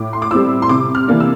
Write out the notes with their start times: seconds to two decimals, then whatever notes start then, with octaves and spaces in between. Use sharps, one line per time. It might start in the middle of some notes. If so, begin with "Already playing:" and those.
Already playing: A2 D6
0.13 C6
0.22 D6
0.31 G3 C4 E4 E6
0.62 C6
0.69 C3 D6
0.95 F6
1.07 E3 A#3 D4
1.20 E6